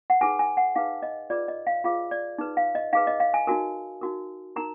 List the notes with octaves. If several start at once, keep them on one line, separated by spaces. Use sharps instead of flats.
F#5
D#4 G#4 B4 G#5
G#5
F#5
D#4 G#4 B4 F5
D#5
F4 G#4 B4 D5
D#5
F5
F4 G#4 B4 F5
D5
D#4 G#4 B4
F5
D#5
D#4 G#4 B4 F5
D#5
F5
G#5
D#4 F#4 A#4 G#5
D#4 F#4 A#4
D#4 A#4 A#5